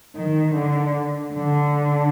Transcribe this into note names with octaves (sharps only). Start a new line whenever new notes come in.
D#3
D3
D3